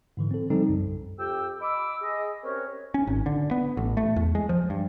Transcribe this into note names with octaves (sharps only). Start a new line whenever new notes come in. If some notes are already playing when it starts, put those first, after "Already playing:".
G#2 D3 E3
C4 A4
C#3 F3 G3 C4 D#4 A4
B1 F#2
F2 G4 G5 E6
D#5 B5 D6 E6
G#4 D#5
C4 C#4 G4 A#4 B4 C#5
C#4
G#1
D3
B3
A1
A3
E2
G#3
F3
G2